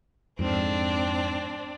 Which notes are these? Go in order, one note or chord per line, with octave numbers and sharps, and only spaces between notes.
F2 G#2 C4 D4